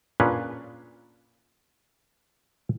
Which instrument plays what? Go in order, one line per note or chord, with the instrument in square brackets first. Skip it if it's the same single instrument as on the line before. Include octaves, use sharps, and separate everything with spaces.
[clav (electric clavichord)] A#2 C#4 D4 G#4 B4